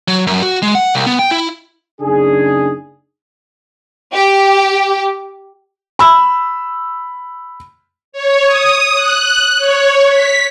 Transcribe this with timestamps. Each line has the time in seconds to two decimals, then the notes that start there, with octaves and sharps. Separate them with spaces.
0.08 F#3
0.27 F#2
0.42 F#4
0.62 G#3
0.75 F#5
0.94 C2
1.07 B3
1.19 G5
1.31 E4
2.01 F#1 C#3 D4 D#4 G#4
4.13 G4
5.99 B5 E6
8.12 C#5
8.46 D#6
8.95 F#6
9.58 C#5
10.09 B6